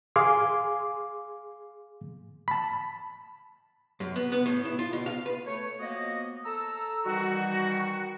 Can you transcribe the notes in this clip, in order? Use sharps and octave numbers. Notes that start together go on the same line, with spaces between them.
G#4 F5 G#5 C6 D6
A5 B5
F#2
B3
B3
A2
E4
F4
B2
F5
B4
A3 C#5
F3 A#3 B3 F#4 D#5
A4 A#5 E6
D#3 E3 G3 F#4